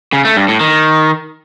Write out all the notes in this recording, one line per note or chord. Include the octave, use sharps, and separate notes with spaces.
C#3
A3
G2
A2
D#3